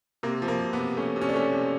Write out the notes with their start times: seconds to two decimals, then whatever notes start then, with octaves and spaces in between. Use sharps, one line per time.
0.23 C3 A#3
0.42 F3
0.48 A#3
0.60 C3
0.73 B3
0.79 C3
0.97 A3 C#4
1.16 C3
1.21 C#4
1.29 D4
1.34 A3 C#4
1.53 C3